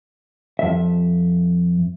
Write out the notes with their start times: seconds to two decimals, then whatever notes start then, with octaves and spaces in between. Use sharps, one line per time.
0.59 F2 E5